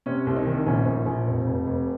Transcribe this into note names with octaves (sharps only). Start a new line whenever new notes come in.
C3 C#4
C2
D#4
D#3
A#1 C#4
A#1
A#1
F1
F1
F1